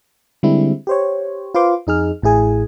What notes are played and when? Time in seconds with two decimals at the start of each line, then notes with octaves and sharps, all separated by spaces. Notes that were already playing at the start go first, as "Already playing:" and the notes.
0.43 D3 G3 G#3 C4 E4
0.87 G4 C5 C#5
1.54 F4 B4 C5 F5 C6 D6
1.87 F2 D#4 G#4 F6
2.22 A1 A2 E4 G#4 G#5